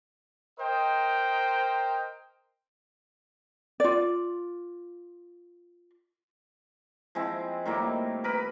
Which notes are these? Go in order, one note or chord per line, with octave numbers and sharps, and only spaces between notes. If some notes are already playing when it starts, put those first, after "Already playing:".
A#4 C5 D#5 G5
F4 D5
F3 G#3 C4 E4
A2 D#3 G3 A#3
A#4 B4 B5